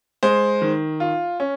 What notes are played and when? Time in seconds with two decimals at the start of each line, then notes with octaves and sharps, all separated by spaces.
0.23 G#3 C5
0.62 D#3
1.00 F4
1.40 C#4